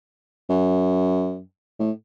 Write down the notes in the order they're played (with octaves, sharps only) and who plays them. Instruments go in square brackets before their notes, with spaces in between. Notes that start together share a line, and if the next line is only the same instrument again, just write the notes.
[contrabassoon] F#2
A2